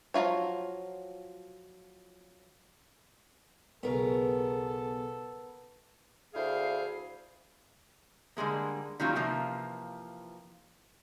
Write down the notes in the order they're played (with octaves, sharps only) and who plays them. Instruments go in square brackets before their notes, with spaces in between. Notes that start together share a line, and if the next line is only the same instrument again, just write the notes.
[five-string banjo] F3 F#3 E4 F4 C#5
[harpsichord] B1 C#3 [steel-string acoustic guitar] B3 A#4 [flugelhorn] A4
[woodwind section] D2 E4 G#4 C5 F5
[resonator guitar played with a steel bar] D3 G3 G#3 A#3
D#3 F#3 G3 A#3 C#4 F4
C3 E3 F3 A#3 F4